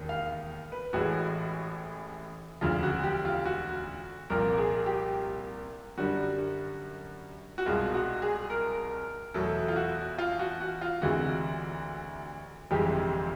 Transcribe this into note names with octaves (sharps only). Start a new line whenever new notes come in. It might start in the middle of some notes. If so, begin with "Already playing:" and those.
Already playing: E1 D#2 D#3
F5
B4
A1 A2 E3 G#3 F#4
E1 D2 C#3 F3 F4
F#4
G4
F4
F#4
C2 A#2 F3 A#3 A#4
G#4
G4
F#2 D3 G3 F#4
F#4
C2 B2 G#3 F4
F#4
G#4
A#4
E2 B2 F#3 A3 A4
F4
F#4
F4
F#4
F#4
F4
D2 C3 E3 G#3 F#4
G1 F2 C3 E3 G#3 G4